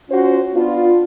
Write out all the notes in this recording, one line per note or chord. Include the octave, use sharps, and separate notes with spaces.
C#4 F4 F#4 C5
B3 D4 F4